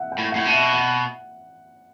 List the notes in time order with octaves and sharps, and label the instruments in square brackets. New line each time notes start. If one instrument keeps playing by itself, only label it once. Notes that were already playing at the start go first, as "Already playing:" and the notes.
Already playing: [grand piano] E5 F#5
G5
[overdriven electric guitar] A2
[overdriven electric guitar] A2 [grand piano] F#5
[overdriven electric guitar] B2
[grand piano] E5
F#5